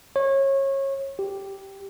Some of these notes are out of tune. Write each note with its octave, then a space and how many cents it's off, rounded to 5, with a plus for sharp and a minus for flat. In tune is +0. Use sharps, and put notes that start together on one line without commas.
C#5 -25
G4 -5